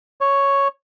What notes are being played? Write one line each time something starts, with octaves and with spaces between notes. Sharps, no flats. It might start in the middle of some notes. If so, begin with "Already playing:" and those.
C#5